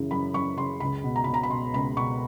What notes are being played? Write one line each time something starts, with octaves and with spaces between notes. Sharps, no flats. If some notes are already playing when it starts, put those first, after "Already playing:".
Already playing: F#2 C#3 E3
F#2 B5
F#2 C#6
C#3 C6
C#2 B5
B2
A#5
B2 B5
A#5
B5
B2 C6
C#2 B5
B2 C#6